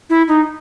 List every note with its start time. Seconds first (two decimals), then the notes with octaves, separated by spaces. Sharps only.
0.10 E4
0.28 D#4